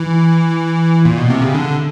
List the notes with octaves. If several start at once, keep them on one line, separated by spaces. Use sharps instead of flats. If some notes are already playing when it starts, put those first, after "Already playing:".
Already playing: E3
A#2
B2
C3
C#3
D3